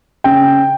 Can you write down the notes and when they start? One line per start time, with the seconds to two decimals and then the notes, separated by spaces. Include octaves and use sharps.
0.24 C#3 G5